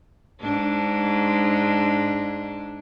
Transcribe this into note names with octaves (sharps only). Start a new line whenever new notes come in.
G#2 D4